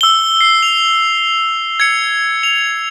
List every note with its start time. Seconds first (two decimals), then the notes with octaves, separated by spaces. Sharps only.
0.01 E6 G7
0.41 C7
0.63 F7
1.80 G#6 C#7
2.43 F7